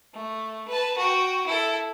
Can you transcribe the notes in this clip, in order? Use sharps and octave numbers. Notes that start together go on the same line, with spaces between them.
A3
B4 A5
F#4 G5
E4 A4